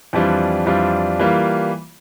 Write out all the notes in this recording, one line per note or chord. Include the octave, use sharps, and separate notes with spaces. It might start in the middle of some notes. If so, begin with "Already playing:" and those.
F2 E3 G3 D4 F4
F2 E3 G3 D4 F4
E3 G3 A#3 F4